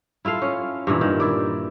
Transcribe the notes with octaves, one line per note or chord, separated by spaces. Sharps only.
E4 F4 A4 F5
C#4
G2 A#2 E3
D#3
E4 D5